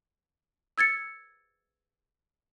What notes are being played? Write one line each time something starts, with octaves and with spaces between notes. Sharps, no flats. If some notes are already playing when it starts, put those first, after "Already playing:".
E6 G#6 A6 C#7